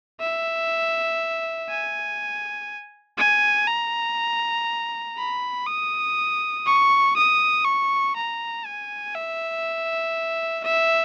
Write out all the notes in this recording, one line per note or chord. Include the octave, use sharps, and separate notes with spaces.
E5
G#5
G#5
A#5
B5
D#6
C#6
D#6
C#6
A#5
G#5
E5
E5